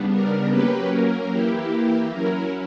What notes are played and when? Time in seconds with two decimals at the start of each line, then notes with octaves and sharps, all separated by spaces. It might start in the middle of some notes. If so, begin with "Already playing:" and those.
Already playing: C#3 G3 B3 D4
0.11 A#4
0.50 F#3 A#3 C#4 G4 B4
0.91 A#4
1.31 E3 A#3 E4 G4
2.11 F#3 C#4 E4 A#4